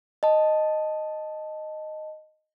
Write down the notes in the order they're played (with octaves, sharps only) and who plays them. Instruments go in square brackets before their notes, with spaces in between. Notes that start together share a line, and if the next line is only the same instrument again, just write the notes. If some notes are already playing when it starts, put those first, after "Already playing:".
[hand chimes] D#5 A5